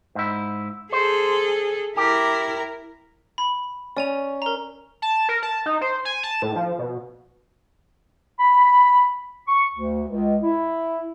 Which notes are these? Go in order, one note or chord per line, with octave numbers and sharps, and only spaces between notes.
G#2 E4
G#4 A4 C5
E4 G4 A#4
B5
C#4 D5 G#5 F7
A#4 A#5
A5
A#4
A5
D#4
C5
G#5
A5
A2
F3
B2
B5
C#6
D2
C#2
E4